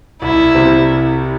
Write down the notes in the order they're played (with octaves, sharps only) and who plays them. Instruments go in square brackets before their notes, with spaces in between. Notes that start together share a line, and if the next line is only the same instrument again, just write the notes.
[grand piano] C2 [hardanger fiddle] E4
[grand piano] C3 G3 C4